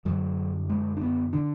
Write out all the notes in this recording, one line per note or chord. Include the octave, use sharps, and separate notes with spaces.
F#2 D3 F#3
G#3
D4
B3
D3 D4